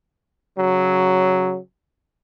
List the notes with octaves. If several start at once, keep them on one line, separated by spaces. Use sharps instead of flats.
C#3 F#3